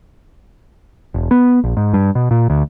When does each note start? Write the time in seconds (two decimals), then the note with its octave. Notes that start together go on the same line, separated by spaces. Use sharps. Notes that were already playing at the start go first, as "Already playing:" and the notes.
1.14 E1
1.31 B3
1.64 A#1
1.77 G#2
1.93 G2
2.15 B2
2.31 A#2
2.50 D2